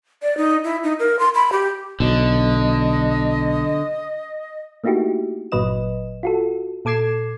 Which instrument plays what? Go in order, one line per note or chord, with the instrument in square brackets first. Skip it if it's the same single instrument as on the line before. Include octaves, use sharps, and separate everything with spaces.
[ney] D5
D#4
E4
D#4
A#4
C6
B5
G4
[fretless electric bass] B1 [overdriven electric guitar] D3 [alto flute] D#5
[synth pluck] A3 A#3 D#4 E4 F#4 G4
G1 A#2 F#3 B4 D#5 E7
F4 F#4 A4
A#2 A4 D6 G#6 C7 E7